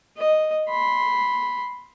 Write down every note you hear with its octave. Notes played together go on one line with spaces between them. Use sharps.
D#5
B5 C6